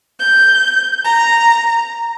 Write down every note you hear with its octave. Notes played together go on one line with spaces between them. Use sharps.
G6
A#5